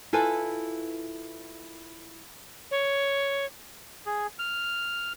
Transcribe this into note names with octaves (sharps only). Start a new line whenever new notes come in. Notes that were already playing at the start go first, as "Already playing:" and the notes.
E4 F4 A4 B4 G#5
C#5
G#4
F6